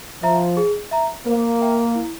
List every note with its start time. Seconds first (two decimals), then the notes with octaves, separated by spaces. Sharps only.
0.23 F3 C5 E5 A#5
0.57 G#4
0.91 E5 A#5
1.26 A#3 C5
1.61 E5 G5 A#5
1.95 E4